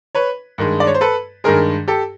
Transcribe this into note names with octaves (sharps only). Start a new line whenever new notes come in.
B4 C#5
G2 D#3 G#3
D5
C#5
C5
A4 B4
G2 D#3 G#3 G#4 A#4
G4 A4